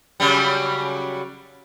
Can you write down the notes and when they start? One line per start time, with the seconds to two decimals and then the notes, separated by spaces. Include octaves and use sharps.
0.20 C#3 F#3 G3